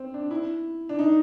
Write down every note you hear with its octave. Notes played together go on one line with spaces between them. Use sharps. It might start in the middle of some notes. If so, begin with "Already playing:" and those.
Already playing: C4
D4
E4
D4
D#4